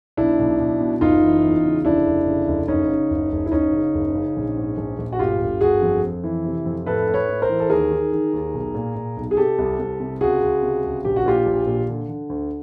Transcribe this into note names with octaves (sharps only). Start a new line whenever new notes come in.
B1 D4 E4
B1
B1
B2
F#1 D#4 F4
E3
E2
C#3
F1 D4 E4
F1
C#3
F1
F#1 C#4 D#4
C#3
F#1
F#1
E4
F#1 C#4 D#4
C#3
F#1
C#3
A#1
G#2
A#1
A#1
F#4
G1 F4 G4
G1
G1 F#4 G#4
F2
F2
E3
C3
F2
A2 A4 B4
A2
B4 C#5
A2
A#4 C5
E3
A4
D#2 G#4 A#4
D#3
D#3
D#2
B1
A#2
A#2
B1
G#4
C3 G4 A4
C2
C2
C3
C#2 F#4 G#4
C#2
C3
C#2
A#1 G4
F#4
A#2 F4 G4
A#1
A#2
D3
D3
D2